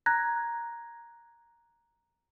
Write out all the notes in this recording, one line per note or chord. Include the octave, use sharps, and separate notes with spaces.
A#5 F#6 G#6 A#6